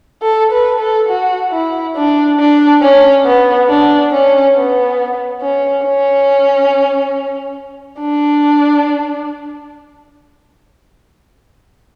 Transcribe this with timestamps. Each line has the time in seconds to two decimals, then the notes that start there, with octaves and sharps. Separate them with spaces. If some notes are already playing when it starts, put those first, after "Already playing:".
0.23 A4
0.52 B4
0.80 A4
1.09 F#4
1.52 E4
1.96 D4
2.39 D4
2.82 C#4
3.25 B3
3.69 D4
4.12 C#4
4.55 B3
5.41 C#4
5.84 C#4
8.00 D4